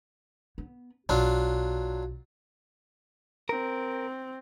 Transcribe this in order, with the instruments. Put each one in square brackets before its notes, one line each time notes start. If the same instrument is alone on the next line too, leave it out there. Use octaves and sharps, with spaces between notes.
[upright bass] B3
[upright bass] B1 [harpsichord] F#3 D4 F4
[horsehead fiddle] C4 [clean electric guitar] A#4